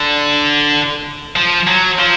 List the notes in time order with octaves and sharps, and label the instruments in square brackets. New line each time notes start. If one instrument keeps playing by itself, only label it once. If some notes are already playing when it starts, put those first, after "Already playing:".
Already playing: [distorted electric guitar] D3
F3
F#3
F3